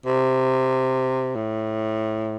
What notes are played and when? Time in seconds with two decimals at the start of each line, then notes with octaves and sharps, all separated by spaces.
0.06 C3
1.35 A2